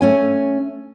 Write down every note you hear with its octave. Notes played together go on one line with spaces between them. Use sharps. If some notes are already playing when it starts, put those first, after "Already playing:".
A3 C#4 G#5